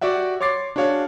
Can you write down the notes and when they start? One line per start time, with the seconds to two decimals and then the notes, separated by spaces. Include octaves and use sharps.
0.01 F#4 G4 D5 E5 F#5
0.41 C#5 C6 D6 A6 C7
0.76 D4 F#4 G#4 C#5 F5